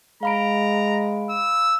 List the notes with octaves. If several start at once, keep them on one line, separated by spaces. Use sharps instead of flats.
G#3 F5 A#5 B5 D7
E6